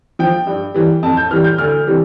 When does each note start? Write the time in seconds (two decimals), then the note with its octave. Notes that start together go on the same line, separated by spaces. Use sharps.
0.19 F3 G5
0.47 G2
0.74 E3 G3
1.03 F2 A5
1.17 G6
1.31 E3 G3 F6
1.44 G6
1.58 D2 F6
1.87 C3 E3 G3